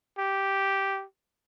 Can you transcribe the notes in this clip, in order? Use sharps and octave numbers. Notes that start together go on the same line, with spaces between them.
G4